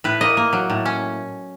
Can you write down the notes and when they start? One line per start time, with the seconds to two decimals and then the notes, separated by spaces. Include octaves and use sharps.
0.04 A2 B4
0.21 A#3 D#5
0.37 A#3
0.53 F#3
0.70 A2
0.85 C#4